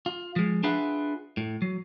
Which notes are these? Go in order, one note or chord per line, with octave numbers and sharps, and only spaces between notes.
F4
F3 G#3
D4 F4 G#4 B4 E5 F#5
A2
F#3